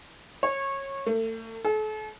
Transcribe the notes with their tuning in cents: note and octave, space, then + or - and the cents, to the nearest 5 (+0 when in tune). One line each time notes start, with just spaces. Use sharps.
C#5 -20
A3 +35
A4 -40